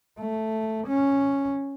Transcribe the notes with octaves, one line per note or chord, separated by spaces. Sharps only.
A3
C#4